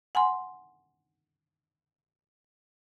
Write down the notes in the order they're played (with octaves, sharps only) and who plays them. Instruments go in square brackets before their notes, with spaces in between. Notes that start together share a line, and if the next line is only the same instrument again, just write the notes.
[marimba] F#5 G#5 A#5 C6